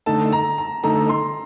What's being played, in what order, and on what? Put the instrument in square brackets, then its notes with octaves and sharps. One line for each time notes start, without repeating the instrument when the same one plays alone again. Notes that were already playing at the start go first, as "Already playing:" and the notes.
[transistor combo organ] D3 A3 D#4 A4 [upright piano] A5
[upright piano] A#5
A#5
[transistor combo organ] D3 A3 D#4 A4 [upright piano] A#5
[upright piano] C6